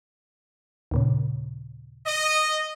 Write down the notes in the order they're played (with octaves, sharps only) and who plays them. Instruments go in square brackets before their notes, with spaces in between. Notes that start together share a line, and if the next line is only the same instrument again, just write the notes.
[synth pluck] D#2 A#2 C#3
[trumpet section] D#5